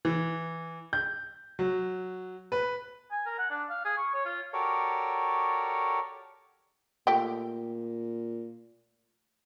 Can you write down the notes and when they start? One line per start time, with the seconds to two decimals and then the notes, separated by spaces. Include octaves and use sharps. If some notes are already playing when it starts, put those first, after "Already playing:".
0.05 E3
0.93 G6
1.59 F#3
2.52 B4
3.11 G#5
3.26 A#4
3.39 F#5
3.51 D4
3.70 F5
3.85 G#4
3.97 C#6
4.14 C#5
4.26 F4
4.53 F#4 G4 A4 A#4 C#5 D5
7.07 A#2 A3 G4 G5